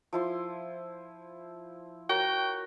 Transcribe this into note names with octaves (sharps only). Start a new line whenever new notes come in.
F3 E4 C6
F#4 A#4 C#5 G5